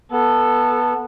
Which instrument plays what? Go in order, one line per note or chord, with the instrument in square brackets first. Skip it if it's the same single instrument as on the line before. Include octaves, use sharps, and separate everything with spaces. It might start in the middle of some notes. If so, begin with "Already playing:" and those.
[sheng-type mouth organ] B3 [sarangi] A4